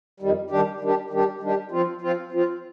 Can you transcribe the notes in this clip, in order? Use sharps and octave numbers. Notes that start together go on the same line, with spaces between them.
F2 D#3 G3
D#3 G3 D4 G4
D#3 G3 D4 G4
D#3 G3 D4 G4
D#3 G3 D4 G4
F3 C4 F4
F3 C4 F4
F3 C4 F4